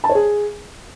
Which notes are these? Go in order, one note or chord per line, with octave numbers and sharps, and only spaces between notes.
A5
C#5
G#4